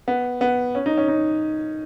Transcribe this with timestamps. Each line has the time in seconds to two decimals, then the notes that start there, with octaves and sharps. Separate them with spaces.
0.08 B3
0.41 B3
0.75 C#4
0.86 D#4
0.97 C#4
1.08 D#4